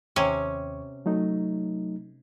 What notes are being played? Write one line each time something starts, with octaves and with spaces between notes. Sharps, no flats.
D#2 C3 C#4 C#6
F#3 A3 D#4